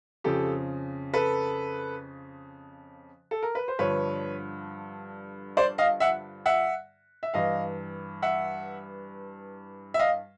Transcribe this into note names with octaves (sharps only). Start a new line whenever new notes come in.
F2 C#3 F3 G4 A4
A4 B4
A4
A#4
B4
C5
G2 D3 F3 B4 C#5
C5 D5
D#5 F5
E5 F#5
E5 F#5
E5
G2 E3 D#5 F5
E5 F#5
E5
D#5 F5